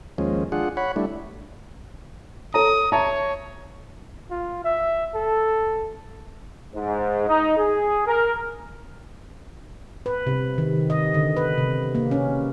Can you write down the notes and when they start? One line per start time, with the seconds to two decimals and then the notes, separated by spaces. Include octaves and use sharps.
0.18 D#2 F3 G#3 C#4
0.52 D4 F4 G#4 F#5
0.77 C#5 F#5 B5
0.96 G3 A3 D4 E4
2.54 A4 C#5 A#5 D#6
2.92 C#5 E5 A5 A#5
4.31 F4
4.64 E5
5.15 A4
6.74 G#2
7.27 D#4
7.57 G#4
8.07 A#4
10.06 B4
10.27 C3
10.58 D#3
10.90 D#5
11.14 D3
11.36 B4
11.58 C3
11.95 A#3
12.11 C#4